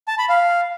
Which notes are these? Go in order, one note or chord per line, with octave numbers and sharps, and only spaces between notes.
A5
B5
F5